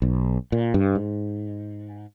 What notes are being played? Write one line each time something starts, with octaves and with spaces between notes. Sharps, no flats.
B1
A#2
G2
G#2